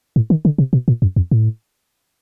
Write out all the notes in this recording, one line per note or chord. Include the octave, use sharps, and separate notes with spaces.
A2
D#3
D3
C3
B2
A#2
F#2
F2
A2